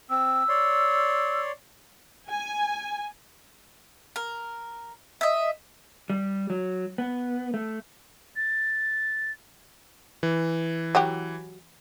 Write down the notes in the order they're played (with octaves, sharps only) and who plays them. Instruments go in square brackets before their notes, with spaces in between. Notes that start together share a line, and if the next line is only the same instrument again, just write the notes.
[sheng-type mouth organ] C4 [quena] E6
[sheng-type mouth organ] C#5 D5 C6
[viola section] G#5
[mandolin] A#4
D#5 E5
[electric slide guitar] G3
F#3
B3
A3
[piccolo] A6
[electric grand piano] E3
[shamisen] F#3 F#4 G4